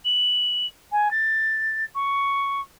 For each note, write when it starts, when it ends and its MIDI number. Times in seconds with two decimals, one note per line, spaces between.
0.05 0.67 102
0.92 1.11 80
1.11 1.84 93
1.95 2.61 85